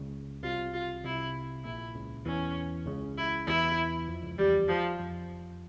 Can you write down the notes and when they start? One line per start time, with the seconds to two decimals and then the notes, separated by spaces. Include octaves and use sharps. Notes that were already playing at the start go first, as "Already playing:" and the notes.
Already playing: C#2 C#3
0.43 C2 C3 F4
0.74 F4
1.04 C2 C3 E4
1.64 A#1 A#2 E4
1.95 C#2 C#3
2.25 E2 E3 C#4
2.86 C#2 C#3
3.18 E4
3.47 E2 E3 E4
4.08 F2 F3
4.23 C#2 C#3
4.38 E2 E3 G3
4.68 F3
4.99 F2 F3